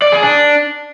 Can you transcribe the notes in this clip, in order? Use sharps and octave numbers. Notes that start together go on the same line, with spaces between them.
D5
G#4
D4